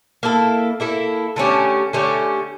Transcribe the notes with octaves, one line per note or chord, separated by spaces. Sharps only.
A#3 E4 A4
A#3 E4 A4
D3 A3 C#4 G4
D3 A3 C#4 G4